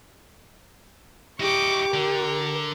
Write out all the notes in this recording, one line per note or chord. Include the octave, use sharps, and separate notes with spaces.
E4 G4 D#5 C#6 D6
D3 A#4